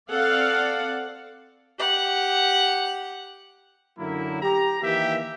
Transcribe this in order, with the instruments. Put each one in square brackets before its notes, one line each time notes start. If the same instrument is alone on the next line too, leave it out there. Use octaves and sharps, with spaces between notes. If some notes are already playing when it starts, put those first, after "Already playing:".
[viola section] C4 A4 D5 F5 F#5
[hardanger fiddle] G4 F#5
[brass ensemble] F#2 D3 F#3 A#3 E4
G4 A#5
D#3 E3 A#3 G4 E5